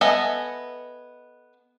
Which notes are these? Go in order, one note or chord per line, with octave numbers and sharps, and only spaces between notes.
B3 A4 D#5 E5 G#5